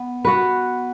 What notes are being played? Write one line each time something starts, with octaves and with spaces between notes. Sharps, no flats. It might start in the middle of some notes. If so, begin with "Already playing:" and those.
Already playing: B3
B3 F#4 B4